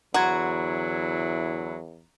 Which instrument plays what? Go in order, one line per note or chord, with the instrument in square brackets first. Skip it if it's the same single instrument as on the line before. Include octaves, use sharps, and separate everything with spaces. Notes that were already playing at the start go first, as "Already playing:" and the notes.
[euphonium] E2 [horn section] D3 F#3 E4 [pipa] F#4 [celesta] A#5 C6 G#6